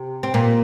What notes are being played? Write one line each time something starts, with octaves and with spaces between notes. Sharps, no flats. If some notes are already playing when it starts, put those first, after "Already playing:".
Already playing: C3
C4
A#2 A#3